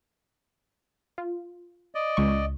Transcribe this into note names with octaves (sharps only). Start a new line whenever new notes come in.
F4
D5 D#5
C#2 C#6